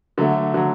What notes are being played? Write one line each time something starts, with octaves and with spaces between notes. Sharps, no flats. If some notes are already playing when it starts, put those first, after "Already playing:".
D3 F#3 A3
D3 F#3